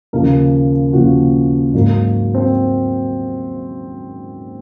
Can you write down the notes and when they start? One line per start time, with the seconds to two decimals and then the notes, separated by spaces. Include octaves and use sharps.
0.13 D#2 C#3 F3 A#3 A#4
0.93 D#2 C#3 F3 A#3 F#4
1.73 G#2 F#3 A#3
2.35 C4